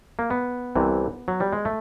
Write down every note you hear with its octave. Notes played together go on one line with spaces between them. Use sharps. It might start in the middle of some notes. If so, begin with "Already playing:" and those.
A#3
B3
C2 C3 E3
F#3
G3
G#3
A3